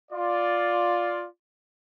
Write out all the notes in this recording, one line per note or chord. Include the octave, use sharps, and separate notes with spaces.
F4 D5